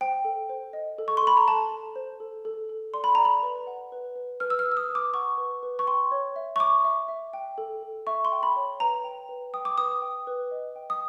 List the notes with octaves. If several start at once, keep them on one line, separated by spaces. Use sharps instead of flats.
C5 G5
A4
C5
D#5
A4
C#6
C6
A4 B5
A#5
A4 A5
A4
C5
A4
A4
A4
D5 C6
B5
D5 A#5
B5
B4
F#5
B4
B4
B4 F6
E6
F6
B4
E6
D#6
B4
D6
F#5 C#6
B4
B4
C#6
G5 C6
C#5
E5
C#6
E5 D6
E5
E5
G5
A4
A4
E5 C#6
C6
G5
B5
C#5
B4 A#5
G5
B4
G5 D#6
D6
B4 D#6
G5
B4
D#5
G5
D#6